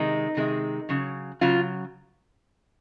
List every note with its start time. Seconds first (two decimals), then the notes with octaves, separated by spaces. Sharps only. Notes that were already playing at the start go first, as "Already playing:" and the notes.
Already playing: C3 D#3 G#3 D#4
0.37 C3 D#3 G#3
0.89 C#3 F#3
1.41 C#3 F#3 F4